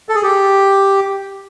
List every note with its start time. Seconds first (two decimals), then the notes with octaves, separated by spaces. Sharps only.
0.09 A4
0.15 G#4
0.23 G4